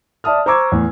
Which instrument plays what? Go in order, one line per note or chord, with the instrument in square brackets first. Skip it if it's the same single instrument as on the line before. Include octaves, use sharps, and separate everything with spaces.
[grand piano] D5 E5 A5 D#6 F6
C5 A#5 C#6 D6 E6 G#6
E2 A2